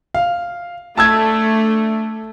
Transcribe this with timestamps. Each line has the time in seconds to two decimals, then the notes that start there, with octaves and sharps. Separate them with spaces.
0.14 F5
0.97 A3 D4 A5 E6 G#6